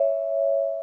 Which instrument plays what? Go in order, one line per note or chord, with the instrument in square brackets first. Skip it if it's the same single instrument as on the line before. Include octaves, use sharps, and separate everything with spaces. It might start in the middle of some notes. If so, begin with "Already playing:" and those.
Already playing: [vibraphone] C#5 E5